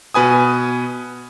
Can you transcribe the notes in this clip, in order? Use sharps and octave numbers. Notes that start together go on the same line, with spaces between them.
B2 B4 G#5 D#6